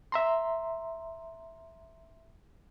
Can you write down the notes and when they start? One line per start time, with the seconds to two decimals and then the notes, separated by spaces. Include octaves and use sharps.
0.12 E5 A#5 C6